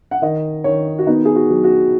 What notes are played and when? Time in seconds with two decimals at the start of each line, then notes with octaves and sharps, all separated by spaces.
0.11 F#5
0.22 D#3 D#5
0.64 D#3 C#5
0.99 F#4
1.07 B3 D#4
1.25 G#4
1.36 F#4
1.50 F#3
1.64 F#4